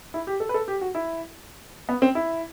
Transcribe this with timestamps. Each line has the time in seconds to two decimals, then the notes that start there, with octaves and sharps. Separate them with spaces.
0.14 E4
0.27 G4
0.40 A4
0.49 B4
0.54 A4
0.68 G4
0.81 F#4
0.95 E4
1.89 B3
2.02 C4
2.15 E4